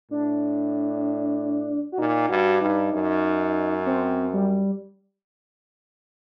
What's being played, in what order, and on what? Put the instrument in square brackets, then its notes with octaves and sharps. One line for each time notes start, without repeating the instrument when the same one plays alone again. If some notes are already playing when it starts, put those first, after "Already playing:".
[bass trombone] A2 [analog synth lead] D4
[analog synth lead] F#4
[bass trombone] A#2 [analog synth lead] D#4
[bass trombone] G2 [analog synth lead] F#4
[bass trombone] G2 [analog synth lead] D#4
[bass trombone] F#2
[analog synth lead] C4
G3